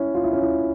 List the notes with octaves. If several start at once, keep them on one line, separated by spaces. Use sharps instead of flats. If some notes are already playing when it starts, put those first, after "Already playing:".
Already playing: C#4 E4
F4
E4
C#4
E4